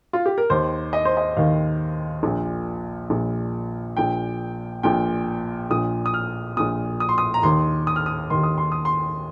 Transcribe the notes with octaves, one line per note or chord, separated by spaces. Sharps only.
F4
G4
A#4
D#2 D#3 C5
D#5
C5
D#5
D#2 D#3 F5
A#1 A#2
A#1 A#2
A#1 A#2 G5
A#1 A#2 G5
A#1 A#2 D#6
D#6
F6
A#1 A#2 D#6
D#6
C6
D#6
A#5
D#2 D#3 C6
D#6
F6
D#6
D#2 D#3 C6
D#6
C6
D#6
C6